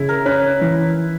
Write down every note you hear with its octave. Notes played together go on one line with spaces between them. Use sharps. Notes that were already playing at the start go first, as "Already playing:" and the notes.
Already playing: C#3 E4
A#4
C#4 B4
E3